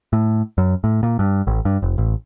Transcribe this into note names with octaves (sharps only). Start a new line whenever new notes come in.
A2
F#2
A2
A#2
G2
A1
G2
F1
A1